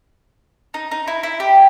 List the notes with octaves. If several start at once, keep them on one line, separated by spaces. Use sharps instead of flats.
D#4
D#4
E4
E4
G4